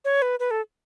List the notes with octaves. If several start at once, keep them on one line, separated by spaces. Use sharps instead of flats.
C#5
B4
B4
A4